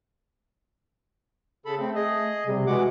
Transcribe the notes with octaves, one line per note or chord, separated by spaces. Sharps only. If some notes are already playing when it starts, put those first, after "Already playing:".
C#3 A4 B5
A3 C4
G#4 D#5
C3 G3
E3 G#3 F#4 F#5 D6